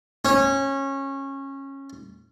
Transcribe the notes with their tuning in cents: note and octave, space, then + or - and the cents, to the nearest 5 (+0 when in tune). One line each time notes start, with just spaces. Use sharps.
C#4 -20